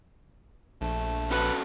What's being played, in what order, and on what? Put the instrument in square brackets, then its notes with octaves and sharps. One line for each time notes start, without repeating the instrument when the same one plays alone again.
[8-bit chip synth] A#1 [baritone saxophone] A3
[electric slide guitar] C#4 F#4 A4 [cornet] B4